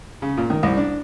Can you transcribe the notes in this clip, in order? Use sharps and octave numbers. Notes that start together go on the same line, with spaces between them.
C#3
A#2
D#3
C2
D4